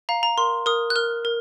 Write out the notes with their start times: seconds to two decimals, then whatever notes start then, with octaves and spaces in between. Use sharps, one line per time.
0.09 F5 A#5
0.23 A#5
0.37 A#4 C6
0.66 A#4 D#6
0.90 F#6
0.96 A#4 F6
1.25 A#4